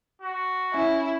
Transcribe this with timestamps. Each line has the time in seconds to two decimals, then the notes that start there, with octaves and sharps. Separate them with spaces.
0.22 F#4
0.74 C#4 E4